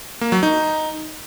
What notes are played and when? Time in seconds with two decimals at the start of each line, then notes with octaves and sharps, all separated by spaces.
0.21 A#3
0.32 F#3
0.43 D#4